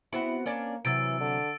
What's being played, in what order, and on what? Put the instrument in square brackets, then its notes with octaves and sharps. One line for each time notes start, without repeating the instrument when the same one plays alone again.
[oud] B3 C4 F#4 [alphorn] E4
[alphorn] A#3 [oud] C#4 D4 D5
[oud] C3 F#3 [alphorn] E3 [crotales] E6 A6 D7
[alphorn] D3